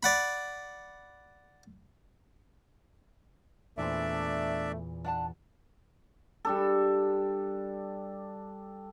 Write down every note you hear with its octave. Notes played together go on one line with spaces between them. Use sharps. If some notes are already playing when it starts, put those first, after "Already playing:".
D5 F#5 B5
E2 A#2 A3 D4 E4 C5 D5 E5
D4 F#5 A5
G3 D4 A4